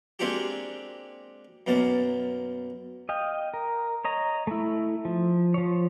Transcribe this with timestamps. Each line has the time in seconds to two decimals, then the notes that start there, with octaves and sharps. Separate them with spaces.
0.19 G#3 A#3 C4 D4 F#4 G4
1.67 F#2 B2 A#3 A5
3.09 D#5 F5 G5
3.54 A#4
4.05 C#5 D#5 A#5
4.47 A3 E4
5.05 F3
5.54 F3 C#5